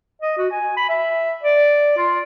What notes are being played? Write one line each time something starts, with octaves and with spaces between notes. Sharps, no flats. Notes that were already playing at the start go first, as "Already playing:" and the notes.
D#5
F#4
G#5
B5
E5
D5
F4